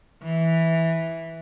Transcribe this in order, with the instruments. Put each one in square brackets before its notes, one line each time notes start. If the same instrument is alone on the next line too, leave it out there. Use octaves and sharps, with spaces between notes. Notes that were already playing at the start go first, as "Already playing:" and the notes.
[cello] E3